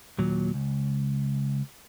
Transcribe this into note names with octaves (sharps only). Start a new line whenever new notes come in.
D#2 A#2 F#3
C#2